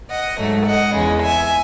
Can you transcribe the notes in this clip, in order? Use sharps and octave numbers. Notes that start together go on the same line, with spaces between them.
D#5 F#5
G#2 F#3 A3
D#5 F#5
E2 C#3 G#3
E5 G#5